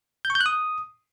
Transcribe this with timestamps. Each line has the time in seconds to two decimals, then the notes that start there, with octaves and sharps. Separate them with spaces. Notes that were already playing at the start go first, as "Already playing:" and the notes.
0.25 G6
0.30 C#6
0.35 G6
0.40 F#6
0.46 D#6